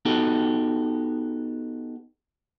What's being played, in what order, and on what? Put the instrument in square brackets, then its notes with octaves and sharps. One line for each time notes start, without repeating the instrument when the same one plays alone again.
[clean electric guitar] B3 D#4 F#4 G4 A4